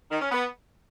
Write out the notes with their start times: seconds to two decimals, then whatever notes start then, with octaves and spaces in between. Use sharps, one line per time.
0.10 D#3
0.21 C#4
0.31 B3